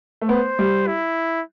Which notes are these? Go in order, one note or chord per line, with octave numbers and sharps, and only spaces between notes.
A3
B3 C5
G3
E4